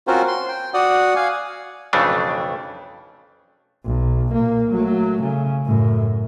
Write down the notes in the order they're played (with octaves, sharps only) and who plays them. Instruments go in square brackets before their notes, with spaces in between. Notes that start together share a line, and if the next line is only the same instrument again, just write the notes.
[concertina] C4 C#4 F4 F#4 A#4 C5
C6
G5
F#4 D5 F#5 D#6
F5 G#5
[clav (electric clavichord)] B1 F2 C#3 E3 A3 D4
[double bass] B1
A#2 A#3
F#3 A3
C#3
F#2 A2